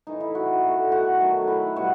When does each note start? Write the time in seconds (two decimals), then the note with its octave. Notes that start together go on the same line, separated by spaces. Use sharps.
0.07 A2 E3 A3 D#4
0.20 E4
0.35 F#4
0.63 B2 A3
0.92 F#4
1.19 D#3 F#3 A3
1.48 E4
1.76 B2 G3 F#4